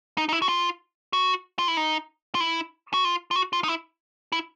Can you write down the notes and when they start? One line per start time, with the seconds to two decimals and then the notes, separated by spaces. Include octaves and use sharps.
0.18 D#4
0.29 D#4
0.33 E4
0.42 F#4
0.49 F4
1.13 F#4
1.59 F4
1.68 E4
1.77 D#4
2.35 F4
2.40 E4
2.94 F#4
3.05 F4
3.31 F4
3.36 F#4
3.53 F4
3.64 D#4
3.68 E4
4.32 E4